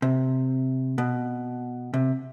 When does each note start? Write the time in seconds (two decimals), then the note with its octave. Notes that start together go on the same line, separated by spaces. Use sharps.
0.02 C3
0.98 B2
1.94 C3